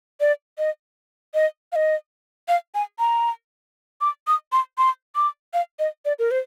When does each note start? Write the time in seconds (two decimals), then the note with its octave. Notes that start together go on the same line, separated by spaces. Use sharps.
0.20 D5
0.58 D#5
1.34 D#5
1.72 F5
1.76 D#5
2.48 F5
2.75 G#5
2.99 A#5
4.01 D6
4.28 D#6
4.52 C6
4.78 C6
5.16 D6
5.54 F5
5.79 D#5
6.05 D5
6.19 A#4
6.31 C5